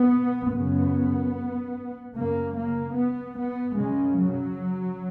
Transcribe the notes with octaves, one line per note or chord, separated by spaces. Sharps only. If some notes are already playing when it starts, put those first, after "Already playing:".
Already playing: B3
F#2 C#3 B3
F#2 C#3 A#3
A#3
B3
B3
F#2 C#3 G#3
F#3